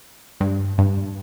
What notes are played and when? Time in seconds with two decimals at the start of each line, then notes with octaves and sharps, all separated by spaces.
0.40 G2
0.78 G2